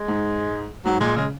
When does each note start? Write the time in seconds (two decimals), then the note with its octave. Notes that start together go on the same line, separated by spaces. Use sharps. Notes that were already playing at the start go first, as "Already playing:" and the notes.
Already playing: G#3
0.08 G#2
0.85 G#2 F#3
1.00 A#2 G#3
1.16 C#3 G#3